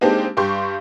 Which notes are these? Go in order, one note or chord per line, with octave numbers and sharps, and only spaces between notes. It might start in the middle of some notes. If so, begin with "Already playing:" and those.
G#3 A#3 C4 D4 D#4 G4
G2 G4 C6 C#6 G6